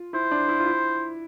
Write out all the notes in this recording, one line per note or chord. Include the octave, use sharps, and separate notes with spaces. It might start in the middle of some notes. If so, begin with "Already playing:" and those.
Already playing: F4
E4 C5
D4
E4
F4
E4